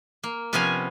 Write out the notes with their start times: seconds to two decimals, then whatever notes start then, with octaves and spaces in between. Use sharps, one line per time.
0.23 A#3
0.53 C3 F3 B3 C#4 F5 G#5